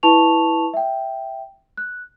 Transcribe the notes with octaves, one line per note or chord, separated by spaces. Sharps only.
E4 B4 A5 C#6 F7
E5 G5
F#6